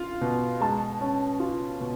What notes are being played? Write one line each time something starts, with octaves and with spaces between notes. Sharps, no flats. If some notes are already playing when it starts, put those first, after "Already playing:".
Already playing: F4
B2
G#3 A5
C#4
F4
B2